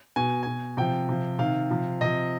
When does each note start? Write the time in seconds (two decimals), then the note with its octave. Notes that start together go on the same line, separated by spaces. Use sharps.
0.16 B2 G#5
0.43 B2 G#5
0.77 C3 F3 G5
1.09 C3 F3
1.39 C3 D#3 F5
1.71 C3 F3
2.01 C3 F3 D#5